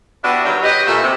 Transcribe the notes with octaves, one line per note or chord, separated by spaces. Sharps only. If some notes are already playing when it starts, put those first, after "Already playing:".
B3 D4 E4 F#4 G4
G2 D#3 F#3
G4 G#4 B4 D#5
A#2 A3 E4 E5
C3